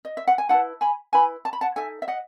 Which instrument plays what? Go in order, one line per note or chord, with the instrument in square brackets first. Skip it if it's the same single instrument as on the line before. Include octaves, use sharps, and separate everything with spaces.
[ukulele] D#5
E5
F#5
G#5
E4 B4 F#5 A5
G#5 B5
E4 B4 G#5 B5
A5
B5
F#5 A5
D#4 A4 E5 G#5
E5
D#5 F#5